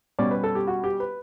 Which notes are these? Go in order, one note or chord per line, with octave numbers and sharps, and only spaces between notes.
B2 G3 C#4 D5
B4
A4
G4
F#4
G4
B4